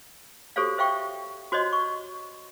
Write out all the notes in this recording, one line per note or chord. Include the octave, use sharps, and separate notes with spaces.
F#4 G4 A4 C5 C#5 F5
C5 E5 F5 G5 C#6
F#4 C5 C#5 D#5 C6
C#6